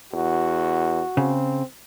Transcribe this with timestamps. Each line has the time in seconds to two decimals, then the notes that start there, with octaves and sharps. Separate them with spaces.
0.13 E2 F#4
1.17 C#3 C4